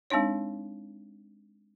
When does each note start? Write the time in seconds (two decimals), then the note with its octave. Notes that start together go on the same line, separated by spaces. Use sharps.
0.10 G#3 C4 D4 D#4 C#5